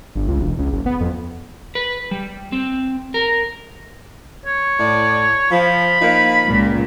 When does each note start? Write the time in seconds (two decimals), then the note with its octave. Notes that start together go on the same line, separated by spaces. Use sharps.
0.15 G1
0.28 C#2
0.40 E1
0.58 C#2
0.73 F#1
0.86 B3
1.01 F2
1.75 B4
2.11 G3
2.52 C4
3.14 A#4
4.46 C#5
4.80 A2 D5
5.51 F3 B5
6.01 F3 A#3 D#4
6.48 C#2 A#2